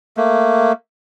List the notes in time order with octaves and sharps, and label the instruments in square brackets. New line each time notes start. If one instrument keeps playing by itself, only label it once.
[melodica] A3 A#3